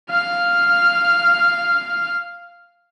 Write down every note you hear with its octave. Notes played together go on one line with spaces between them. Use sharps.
F5 F6